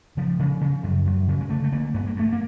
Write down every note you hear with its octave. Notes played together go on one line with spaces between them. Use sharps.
C#3 F3
C#3
C#3
F#2
F#2
C#3
G#3
D3 A3
A3
D3 A#3
G2 B3
A#3
G2 A3
A#3